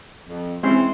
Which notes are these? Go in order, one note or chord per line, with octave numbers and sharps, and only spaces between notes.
F2
E3 G#3 C4 C#4 C5